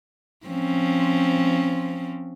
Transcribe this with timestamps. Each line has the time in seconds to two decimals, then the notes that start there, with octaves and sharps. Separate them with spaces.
0.47 F3 C4 C#4